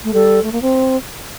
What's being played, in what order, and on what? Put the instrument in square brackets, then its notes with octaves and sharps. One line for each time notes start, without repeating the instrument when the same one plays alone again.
[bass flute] A3
[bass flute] G3 [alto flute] A4
[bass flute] A3
A#3
C4